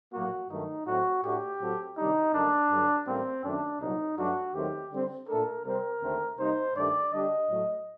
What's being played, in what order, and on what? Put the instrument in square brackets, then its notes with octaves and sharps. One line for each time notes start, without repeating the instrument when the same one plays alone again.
[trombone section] A#1 A2 F#3 A#3 [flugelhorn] F#4
[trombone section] G2 D#3 F#3 A3 [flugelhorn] D#4
[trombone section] A2 F#3 C4 [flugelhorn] F#4
[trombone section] A2 A3 D4 F#4 [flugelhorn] G4
[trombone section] A2 F#3 C4 F#4 A4
[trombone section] C3 D#3 G3 D4 G4 [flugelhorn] D#4
[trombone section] F#2 D3 G3 A#3 [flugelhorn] D4
[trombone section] G2 D3 F#3
[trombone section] A1 A2 G3 A#3 [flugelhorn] C4
[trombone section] F#2 D#3 A3 [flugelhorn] D4
[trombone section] C2 A#2 F#3 [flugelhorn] D#4
[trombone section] G2 F#3 A3 D4 [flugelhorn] F#4
[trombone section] D#2 D#3 F#3 A3 C4 [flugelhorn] G4
[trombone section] D3 G3 C4
[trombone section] A#2 A3 D4 A4 [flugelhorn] A#4
[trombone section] C3 G3 C4 [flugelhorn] A#4
[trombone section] D#2 D3 A3 C4
[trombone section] C3 G3 A#3 D#4 [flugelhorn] C5
[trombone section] G2 D#3 A3 D4 G4 [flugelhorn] D5
[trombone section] D3 G3 D4 G4 [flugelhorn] D#5
[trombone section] A2 F#3 A3